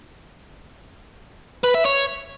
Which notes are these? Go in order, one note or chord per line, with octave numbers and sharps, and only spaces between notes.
B4
E5
C#5